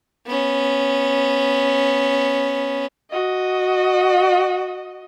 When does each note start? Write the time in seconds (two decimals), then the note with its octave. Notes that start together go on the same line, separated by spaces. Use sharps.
0.27 B3 C#4
3.11 F#4 D#5